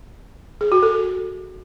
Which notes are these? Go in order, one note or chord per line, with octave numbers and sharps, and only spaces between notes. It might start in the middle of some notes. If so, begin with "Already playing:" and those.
G#4
F#4
A4